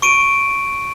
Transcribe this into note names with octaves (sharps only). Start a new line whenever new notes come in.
C#6 D7 D#7